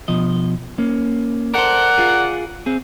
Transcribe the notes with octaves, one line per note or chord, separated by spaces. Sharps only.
B2 F3 D#5
A#3 C#4
A4 A#4 C5 D5 F#5
F4 G#4
C4 G#4